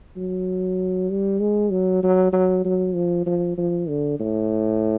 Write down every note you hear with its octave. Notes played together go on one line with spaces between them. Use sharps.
F#3
G3
G#3
F#3
F#3
F#3
F#3
F3
F3
F3
D3
A2